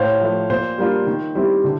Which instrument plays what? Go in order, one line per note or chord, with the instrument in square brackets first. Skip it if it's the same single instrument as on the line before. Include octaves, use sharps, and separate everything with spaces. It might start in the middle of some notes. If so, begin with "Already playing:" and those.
Already playing: [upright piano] A2 [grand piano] C5 C#5 F5
[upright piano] F3 A3
[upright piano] A#2 [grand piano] C5
[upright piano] G3 A#3 D4 F4
D#3
G3 C4 E4 G4
D3